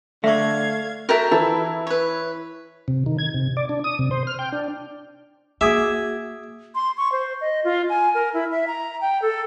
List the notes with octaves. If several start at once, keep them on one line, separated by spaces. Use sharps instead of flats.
D3 A3 E5 F5 C#6 G#6
F#4 A4 A#4 E5 G5 A5
E3 E4 A4
B4 C#5
C3
D#3
G#6
C3
D5
D4
D#6
C3
C5
F6
G5
D4
A#3 F#4 G#4 E5 D6 D#6 G#6
C6
C#6
C5
D#5
F4
G#5
A#4
E4
E5
A#5
G5
A4